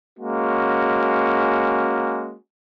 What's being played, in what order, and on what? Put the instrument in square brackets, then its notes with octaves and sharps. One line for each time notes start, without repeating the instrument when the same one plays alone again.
[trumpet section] G#3 A#3 C#4 F#4